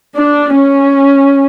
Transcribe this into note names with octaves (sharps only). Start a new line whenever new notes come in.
D4
C#4